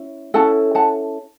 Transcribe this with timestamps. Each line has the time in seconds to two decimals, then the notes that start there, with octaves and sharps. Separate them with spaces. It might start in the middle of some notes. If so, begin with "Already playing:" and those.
Already playing: C#4 E4
0.34 C#4 E4 A4 F#5 A5
0.75 F#5 A5